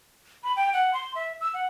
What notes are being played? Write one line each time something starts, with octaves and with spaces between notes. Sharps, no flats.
B5
G5
F#5
C6
E5
E6
F#5